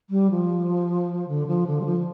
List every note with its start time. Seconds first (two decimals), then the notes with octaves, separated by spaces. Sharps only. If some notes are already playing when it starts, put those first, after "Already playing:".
0.10 G3
0.31 F3
1.28 D3
1.47 F3
1.67 D3
1.81 G3
1.86 F3